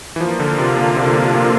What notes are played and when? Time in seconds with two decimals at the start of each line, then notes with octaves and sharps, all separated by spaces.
0.16 E3
0.20 F3 A#3 D4 F4
0.40 D3
0.58 C3
0.77 D3
0.96 C3
1.05 D3
1.13 C3
1.34 A#2